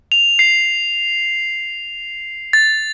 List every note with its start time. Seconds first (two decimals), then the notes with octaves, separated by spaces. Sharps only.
0.12 F7
0.39 C7
2.53 A6